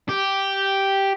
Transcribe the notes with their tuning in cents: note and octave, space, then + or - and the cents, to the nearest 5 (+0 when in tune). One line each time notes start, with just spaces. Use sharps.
G4 -5